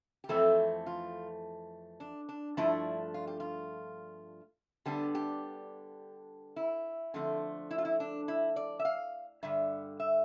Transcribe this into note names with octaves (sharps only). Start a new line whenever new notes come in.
G4
F2 E3 A3 C4 A4
F4
D4
D4
G2 F3 A3 D4 E4
F4
G4
F4
D3 G3 B3 D4 G4
G4
E4
D3 F3 A3 C4
E4
F4
E4
D4
E4
D5
E5
F5
G2 D3 G3 E5
E5